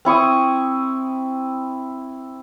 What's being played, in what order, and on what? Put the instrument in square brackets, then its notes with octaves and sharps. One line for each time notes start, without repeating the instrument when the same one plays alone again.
[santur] C4 E4 C#6 D#6